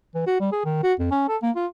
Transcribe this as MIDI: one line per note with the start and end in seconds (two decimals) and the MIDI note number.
0.15 0.23 52
0.27 0.38 66
0.41 0.50 55
0.52 0.65 68
0.65 0.83 51
0.83 0.94 66
1.00 1.10 41
1.11 1.26 61
1.29 1.37 69
1.43 1.51 58
1.56 1.66 65